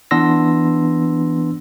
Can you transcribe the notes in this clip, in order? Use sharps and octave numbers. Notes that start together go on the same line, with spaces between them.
E3 B3 D4 C6 E6 A#6